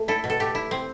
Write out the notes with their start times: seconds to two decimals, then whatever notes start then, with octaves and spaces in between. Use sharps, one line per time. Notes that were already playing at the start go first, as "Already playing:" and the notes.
Already playing: A3
0.08 E4 A4
0.24 B2
0.30 A4
0.40 A3 G4
0.55 E4
0.71 C4